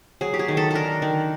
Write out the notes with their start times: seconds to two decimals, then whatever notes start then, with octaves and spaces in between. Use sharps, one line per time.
0.21 F#3 G#4
0.34 G4
0.39 G#4
0.48 D#3
0.57 A4
0.71 D4 A4 A#4
1.02 D#3